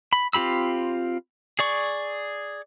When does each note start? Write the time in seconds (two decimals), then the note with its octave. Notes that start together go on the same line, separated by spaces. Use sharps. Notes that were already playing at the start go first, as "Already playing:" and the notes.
0.13 B5
0.33 C4 F4 G4 B5 E6
1.59 G#4 D5 C#6